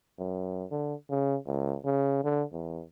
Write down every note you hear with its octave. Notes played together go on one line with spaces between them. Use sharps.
F#2
D3
C#3
C#2
C#3
D3
E2